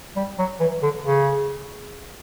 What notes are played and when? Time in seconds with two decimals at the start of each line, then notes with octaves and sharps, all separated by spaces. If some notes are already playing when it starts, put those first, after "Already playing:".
0.16 G3
0.38 F#3
0.60 E3
0.83 D3
1.05 C#3